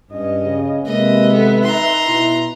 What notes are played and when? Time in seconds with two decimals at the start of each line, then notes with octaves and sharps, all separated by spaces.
0.11 G2 C#4 D#5
0.44 C#3
0.86 C3 D#3 G#3 A#3 B4 D#5 E5
1.32 B3 A4
1.63 D#4 A#5 C6
2.05 B2 E4